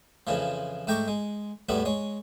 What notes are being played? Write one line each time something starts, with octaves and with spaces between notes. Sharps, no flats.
F2 C#3 E3 F3
G#2 A3 G5 A#5 C#6 D6
G#3
E2 A2 G3 B3 E4
G#3 C#5